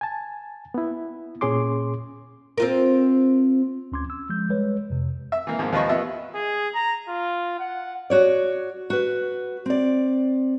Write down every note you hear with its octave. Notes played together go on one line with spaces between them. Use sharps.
G#5 A5
B3 E4
A#2 C#4 G#4 C#5 C6 D6
C4 F4 A#4
D2 C#4 C6 D6 G#6
E6
F3 G#3 G6
G3 G#3 B4 C#5
F2 C3
E5
E3 A#3
G#2 F3 A#3
D#2 F3 B4 D#5 C#6
B3 F4 D#5 E5
G#4
A#5
F4
F#5
F#4 C#5 D5
F#4 B4
C4 D5